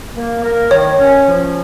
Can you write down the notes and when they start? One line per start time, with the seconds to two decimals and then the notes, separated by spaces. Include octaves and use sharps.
0.15 A#3
0.44 A#4
0.71 D#3 C#5
0.98 C#4
1.27 F3